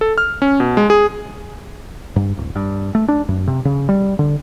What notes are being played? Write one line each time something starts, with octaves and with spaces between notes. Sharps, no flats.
A4
F6
C#4
B2
G#3
G#4
G2
D1
G2
A3
D4
F#2
C3
C#3
G3
D3